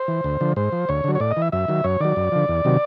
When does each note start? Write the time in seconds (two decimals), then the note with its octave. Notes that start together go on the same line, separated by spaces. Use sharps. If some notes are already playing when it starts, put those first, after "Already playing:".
Already playing: C5
0.08 E3
0.24 D2
0.41 D3 F3
0.56 G#2 C5
0.72 F3
0.89 D2 C#5
1.04 D3 F#3
1.15 C#5
1.20 A2 D5
1.31 D#5
1.37 E3 E5
1.52 F#2 E5
1.68 D#3 F#3
1.84 F#2 C#5
2.00 D#3 F#3 D5
2.16 F#2
2.32 D3 F3
2.48 E2
2.64 C3 D#3 F#3